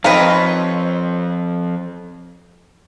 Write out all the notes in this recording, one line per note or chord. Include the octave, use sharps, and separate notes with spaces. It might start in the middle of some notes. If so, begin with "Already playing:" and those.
F2 C4 D#4 B4 C#5 F5 A#5